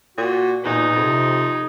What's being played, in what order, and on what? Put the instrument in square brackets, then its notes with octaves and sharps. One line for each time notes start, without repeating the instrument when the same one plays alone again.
[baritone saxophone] A#2 [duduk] F#4
[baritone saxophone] E2 [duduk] A#2 [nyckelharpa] D#4
[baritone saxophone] F2 [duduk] C3